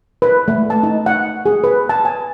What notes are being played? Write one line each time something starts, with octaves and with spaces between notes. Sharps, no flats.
B4
A3
A5
D#4
F#5
G#4
B4
A5
G#5